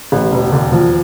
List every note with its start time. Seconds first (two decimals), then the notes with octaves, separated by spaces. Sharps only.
0.12 A1
0.32 E1
0.52 D#2
0.72 F3